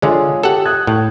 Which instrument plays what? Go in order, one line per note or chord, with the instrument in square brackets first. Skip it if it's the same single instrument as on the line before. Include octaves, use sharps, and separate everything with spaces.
[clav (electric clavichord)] D3 G#3 [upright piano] F4 G#4 C#5
[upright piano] G4 [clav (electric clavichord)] A4 F#5
[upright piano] D#6 F#6 G#6
[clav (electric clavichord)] A2